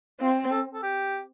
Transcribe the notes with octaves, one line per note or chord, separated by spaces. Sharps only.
C4 F4
A4
A4
G4